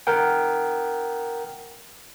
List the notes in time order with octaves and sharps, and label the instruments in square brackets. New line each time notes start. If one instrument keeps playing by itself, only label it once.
[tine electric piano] A#4 F#5 G5